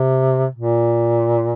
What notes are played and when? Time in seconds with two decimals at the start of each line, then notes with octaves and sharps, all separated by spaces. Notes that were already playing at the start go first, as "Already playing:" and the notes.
Already playing: C3
0.55 A#2